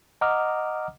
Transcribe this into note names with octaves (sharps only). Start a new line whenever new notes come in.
D#5 F#5 A#5 D6 D#6 F6